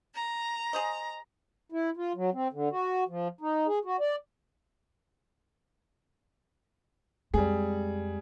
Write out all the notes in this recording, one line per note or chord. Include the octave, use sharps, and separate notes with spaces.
A#5
G#4 C5 D#5
E4
F4
F#3
C4
D3
F#4
F3
D#4
G#4
F#4
D5
F2 G3 G#3 G#4